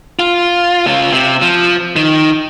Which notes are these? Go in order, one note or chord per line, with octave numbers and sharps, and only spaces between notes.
F4
C#3 F4
C3
F3
D#3